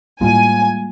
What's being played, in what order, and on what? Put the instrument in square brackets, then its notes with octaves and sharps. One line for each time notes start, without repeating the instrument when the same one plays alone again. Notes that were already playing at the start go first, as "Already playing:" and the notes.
[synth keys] A2 F4 [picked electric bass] G3 G#3 A#3 [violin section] G#5